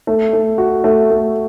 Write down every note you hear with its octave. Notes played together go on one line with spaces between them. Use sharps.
A3
A3
F#4
A3
A3